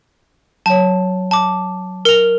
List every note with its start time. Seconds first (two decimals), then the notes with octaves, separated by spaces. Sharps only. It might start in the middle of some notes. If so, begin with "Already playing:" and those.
0.66 F#3 C#5 A5
1.31 A5 D6
2.05 A#4 F7